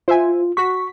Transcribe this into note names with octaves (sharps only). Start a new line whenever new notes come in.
F4 C5 E5 G#5
F#4 C#6 B6